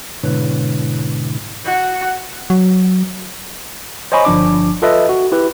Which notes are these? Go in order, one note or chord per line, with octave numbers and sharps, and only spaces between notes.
G#2 B2 D3 E4 B4 C#5
F#4
F#3
C5 C#5 D#5 G#5 B5 C#6
G1 F3 D4 D6
F4 A4 B4 D#5 E5
F#4
E4 G4 B4